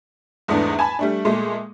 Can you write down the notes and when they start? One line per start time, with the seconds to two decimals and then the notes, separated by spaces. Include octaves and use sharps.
0.48 E2 G#2 A3 B3 D4
0.79 G#5 A5 B5
0.99 G3 A3 D4
1.25 A#2 G#3 A3